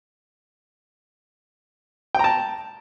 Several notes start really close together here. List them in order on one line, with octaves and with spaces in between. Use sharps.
G5 A#5 A5